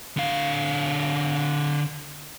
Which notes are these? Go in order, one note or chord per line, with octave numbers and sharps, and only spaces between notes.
D3 F5